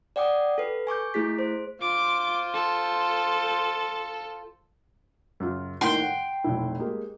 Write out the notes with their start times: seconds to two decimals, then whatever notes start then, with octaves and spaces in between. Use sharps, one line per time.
0.16 D5 F#5 G5 D6 D#6
0.58 A4 B4
0.87 G#5 C#6 D6 G6
1.14 A3 E4 G#4 B6
1.39 C5
1.81 F4 C5 D6
2.54 A4
5.40 F#2 C#3 F4
5.81 A2 D#3 A#3 G5 C6
6.00 F#5
6.44 F1 B1 E4
6.79 G#3 A#3 G4